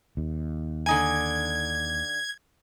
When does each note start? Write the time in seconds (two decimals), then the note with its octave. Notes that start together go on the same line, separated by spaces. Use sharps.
0.17 D#2
0.86 D3 D#4 G#5 G#6